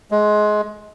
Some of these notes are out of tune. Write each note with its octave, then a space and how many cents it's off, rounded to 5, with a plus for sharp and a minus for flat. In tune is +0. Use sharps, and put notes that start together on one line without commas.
G#3 +20